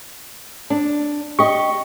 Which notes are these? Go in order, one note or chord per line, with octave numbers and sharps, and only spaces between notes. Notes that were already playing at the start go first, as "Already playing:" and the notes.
D4
G4 D#5 C#6